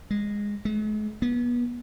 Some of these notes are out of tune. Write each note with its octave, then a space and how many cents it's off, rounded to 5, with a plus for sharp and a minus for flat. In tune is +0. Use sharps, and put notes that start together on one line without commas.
G#3 -10
G#3 +45
B3 -30